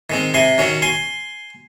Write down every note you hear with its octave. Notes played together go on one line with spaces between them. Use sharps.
D#3 G#3 C4
C3 G#5 C6
D#3 F#3 C#4
G#5 C6